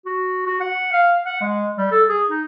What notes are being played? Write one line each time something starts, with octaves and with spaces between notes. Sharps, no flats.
F#4
F#4
F#5
F5
F#5
G#3
G3
A4
G#4
D#4